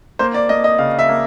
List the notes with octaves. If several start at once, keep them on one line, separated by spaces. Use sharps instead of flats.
A#3 C5
D5
A#3 D#5
D#5
C#3 F5
E5
A#3